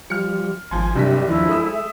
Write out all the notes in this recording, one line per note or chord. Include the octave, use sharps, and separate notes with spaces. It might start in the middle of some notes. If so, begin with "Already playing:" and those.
F3 G3 F6 C#7
G#1 F3 G#5 C6
F#1 G2 C3 D4 G4 E5 B6
D#2 F3 E4
G#3 A3 D#6 E6
E5